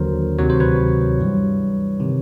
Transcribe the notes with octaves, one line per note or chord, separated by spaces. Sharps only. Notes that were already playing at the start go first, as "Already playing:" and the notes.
Already playing: D#2 D3 F#3 A#4 C5
D2 C3 D#3 F#3 C#5
C5
B4 C#5
G2 E3 G3
C3 D#3